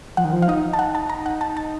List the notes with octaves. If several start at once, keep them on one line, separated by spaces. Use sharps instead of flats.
F3 F#5
D#3
F3
F5
D#4 D#5
A5
F#5
A5
A#5
F#5
A5
A5